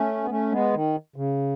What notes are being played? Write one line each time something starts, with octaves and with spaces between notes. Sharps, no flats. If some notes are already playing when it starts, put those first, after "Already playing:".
Already playing: A3 C#4
B3
A3 C#4
G#3 B3
D#3
C#3